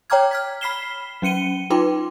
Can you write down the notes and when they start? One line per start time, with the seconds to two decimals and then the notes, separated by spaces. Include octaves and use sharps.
0.10 C#5 G5 A#5 D6 F6 G#6
0.31 F6 G#6 B6
0.61 B5 F6 B6 C7 E7 G7
1.22 F#3 C#4 C#7 D#7 G7
1.70 D#4 F4 B4 G5 C6 D6